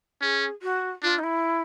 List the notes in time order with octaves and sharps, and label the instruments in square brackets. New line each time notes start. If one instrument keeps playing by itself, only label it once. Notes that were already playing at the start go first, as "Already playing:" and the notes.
[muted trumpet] C#4 [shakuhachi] G#4
[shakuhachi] F#4
[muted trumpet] D4 [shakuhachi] F4
[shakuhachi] D#4
E4